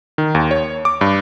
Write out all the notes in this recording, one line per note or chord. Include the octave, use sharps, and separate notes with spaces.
D#3
D#2
C#5
D6
G2